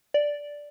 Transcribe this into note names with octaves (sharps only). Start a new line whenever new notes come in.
D5